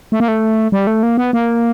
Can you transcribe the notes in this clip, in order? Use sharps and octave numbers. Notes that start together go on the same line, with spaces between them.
A3
A#3
A3
G3
A3
A#3
B3
A#3